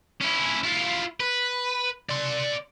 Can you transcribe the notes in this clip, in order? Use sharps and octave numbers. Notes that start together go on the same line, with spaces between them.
C#4 E4
E4 F4
B4
D5 C6